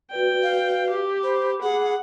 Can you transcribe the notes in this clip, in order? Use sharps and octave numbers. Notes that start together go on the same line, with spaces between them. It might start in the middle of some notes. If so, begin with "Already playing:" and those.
F#4 B4 D5 G5
F5
G4
C5 B5 D6
G#4 F#5